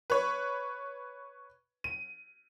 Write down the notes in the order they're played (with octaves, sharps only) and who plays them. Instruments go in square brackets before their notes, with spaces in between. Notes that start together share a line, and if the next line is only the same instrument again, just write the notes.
[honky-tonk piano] B4 C#5
D#7